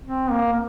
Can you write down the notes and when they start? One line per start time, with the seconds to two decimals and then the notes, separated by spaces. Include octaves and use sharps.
0.05 C4
0.31 A#3
0.53 A#3